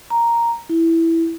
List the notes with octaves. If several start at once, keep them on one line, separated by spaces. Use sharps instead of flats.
A#5
E4